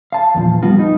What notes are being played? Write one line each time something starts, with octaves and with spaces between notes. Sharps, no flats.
F5 A5
E2 A#2 D3 F3
G3 B3 F4 F#4
D#4